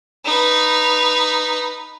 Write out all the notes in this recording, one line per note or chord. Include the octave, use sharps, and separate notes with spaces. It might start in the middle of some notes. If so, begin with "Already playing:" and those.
D#4 B4